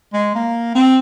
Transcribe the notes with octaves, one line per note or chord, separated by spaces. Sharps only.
G#3
A#3
C4